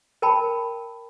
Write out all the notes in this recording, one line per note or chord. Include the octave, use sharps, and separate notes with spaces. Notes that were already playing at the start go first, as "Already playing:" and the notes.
A#4 G5 A5 B5